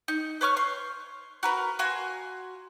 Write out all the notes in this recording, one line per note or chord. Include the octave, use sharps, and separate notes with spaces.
D#4
B4 C#5 C#6 F6
C6
F#4 A#4 B4
F#4 F5 G#5 C6